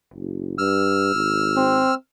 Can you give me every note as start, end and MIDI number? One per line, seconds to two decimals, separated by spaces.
0.14 0.56 30
0.58 1.10 43
0.58 1.94 88
0.58 1.94 89
1.14 1.84 32
1.57 1.94 60